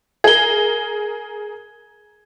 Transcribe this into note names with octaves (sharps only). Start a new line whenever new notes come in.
G#4 A#4 G#6 G7